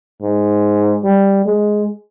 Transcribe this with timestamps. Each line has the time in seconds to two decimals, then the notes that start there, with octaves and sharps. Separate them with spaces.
0.21 G#2
1.04 G3
1.46 G#3